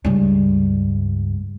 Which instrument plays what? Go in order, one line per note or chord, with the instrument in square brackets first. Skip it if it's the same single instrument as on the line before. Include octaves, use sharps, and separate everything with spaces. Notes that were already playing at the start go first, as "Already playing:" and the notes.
[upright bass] C#2 G2